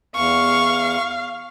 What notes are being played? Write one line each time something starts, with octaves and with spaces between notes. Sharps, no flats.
E2 F5 C#6